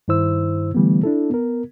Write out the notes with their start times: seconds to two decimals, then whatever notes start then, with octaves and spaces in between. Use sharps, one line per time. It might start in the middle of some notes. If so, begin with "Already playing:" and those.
0.08 G2 D#3 E4 C5 E6
0.74 D3 E3 G3 A3 B3
1.03 D4 E4 A4
1.30 B3 A#4